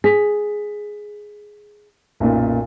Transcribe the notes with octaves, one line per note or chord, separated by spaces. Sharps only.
G#4 B6
B1 F#2 A#2